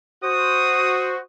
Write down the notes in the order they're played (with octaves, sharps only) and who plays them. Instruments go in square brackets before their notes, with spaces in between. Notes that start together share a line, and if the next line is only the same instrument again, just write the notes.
[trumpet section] F#4 C5 [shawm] D#6